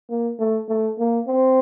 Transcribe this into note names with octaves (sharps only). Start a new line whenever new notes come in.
A#3
A3
A3
A#3
C4